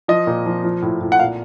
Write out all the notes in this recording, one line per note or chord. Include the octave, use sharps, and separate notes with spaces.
F3 D#5
A#2
F3
F3
A2
A2
F#5
A#2 F5